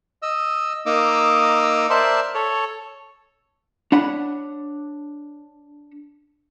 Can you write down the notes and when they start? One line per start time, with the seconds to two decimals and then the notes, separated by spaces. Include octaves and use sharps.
0.22 D#5 E6
0.86 A#3 D#4 D#5 D6 E6
1.90 A#4 C5 D5 E5 A5 C6
2.35 A4 C#5
3.92 D4 C#5 F#5 B5